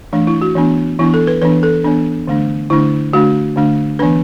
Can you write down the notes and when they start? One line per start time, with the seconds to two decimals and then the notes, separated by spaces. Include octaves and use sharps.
0.13 E3 A3 D4
0.27 E4
0.42 F#4
0.56 E3 B3 D4
0.99 E3 B3 D4 E4
1.14 A4
1.27 B4
1.42 E3 B3 D4 B4
1.63 A4
1.84 E3 B3 D4
2.27 D3 A3 D4
2.70 D3 A3 D4 E4
3.13 D3 A3 D4 F#4
3.56 D3 A3 D4
3.99 E3 B3 D4 B4